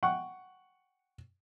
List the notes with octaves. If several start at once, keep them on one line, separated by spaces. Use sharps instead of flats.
F#5 G5 C#6